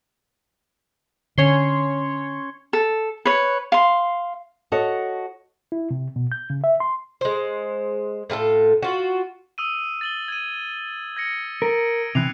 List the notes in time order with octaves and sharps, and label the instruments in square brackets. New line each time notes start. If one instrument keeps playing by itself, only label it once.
[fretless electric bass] D3 [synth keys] C#4 C#5 C6
[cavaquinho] A4
B4 C#5
F5 C6
[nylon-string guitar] F#4 A4 C#5 D#5
[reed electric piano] E4
C3
B2
G6
C#3
E5
C6
[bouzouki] G#3 C5
A2 F4 G#4 A4
F4 F#4
[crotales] D#6 E6 D#7
A6 F#7 G7
G#6 D#7
G#6 A#6 C#7
[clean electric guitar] A#4 [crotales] D7
[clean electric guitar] C3 E3 [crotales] F#6 C7 F7